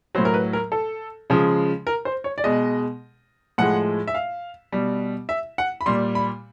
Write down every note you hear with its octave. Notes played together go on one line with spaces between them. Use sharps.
A2 F#3 C5
A#4
B4
A#4
A4
C#3 F3 G#3
A#4
C5
C#5
D5
B2 G#3 D#5
A2 F3 G#3 F#5
E5
F5
B2 G3
E5
F#5
B5
A#2 G3 C6
B5